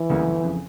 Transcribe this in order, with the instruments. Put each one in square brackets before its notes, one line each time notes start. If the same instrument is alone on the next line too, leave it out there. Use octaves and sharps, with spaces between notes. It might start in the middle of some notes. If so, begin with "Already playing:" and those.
Already playing: [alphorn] E3
[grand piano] D2 C#3 G3 A#3
G1
F2 C#3